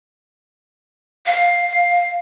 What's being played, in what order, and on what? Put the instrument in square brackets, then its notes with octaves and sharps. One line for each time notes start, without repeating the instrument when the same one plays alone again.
[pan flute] F5